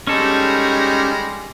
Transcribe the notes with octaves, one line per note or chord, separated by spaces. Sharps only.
G3 G#3 C#4 D#4 A4